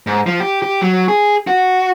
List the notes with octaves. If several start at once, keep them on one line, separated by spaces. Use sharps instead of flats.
G#2
F3
G4
G4
F#3
G#4
F#4